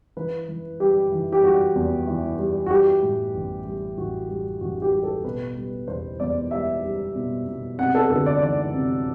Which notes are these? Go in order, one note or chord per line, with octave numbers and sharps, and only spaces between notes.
E3 B4
E3
G3 G4
E3
G4
G3 F#4
E2
E3
G3
F#4
G3 G4
A2
A1
G3
A1 F#4
G3
A1 F#4
G4
G3
A4
B2 B4
G3
E2 C5
E2 D5
G3 E5
G3
B2
B2
C3 F#5
A4
D2 A4
D5
E3 D5
C3